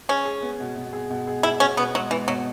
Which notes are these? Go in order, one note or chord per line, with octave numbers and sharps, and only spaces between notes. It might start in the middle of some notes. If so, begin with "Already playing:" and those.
C#4 G#4
G#4
B3
B2
B2
G#4
B2
G#4
E4 G#4
B2 C#4
B2 B3
F#3 G#3
E3 B3
B2 F#3